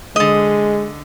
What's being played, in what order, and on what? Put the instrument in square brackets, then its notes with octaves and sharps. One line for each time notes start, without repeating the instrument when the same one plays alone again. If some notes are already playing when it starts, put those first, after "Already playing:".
[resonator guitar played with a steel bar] D3 D#5 [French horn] G#3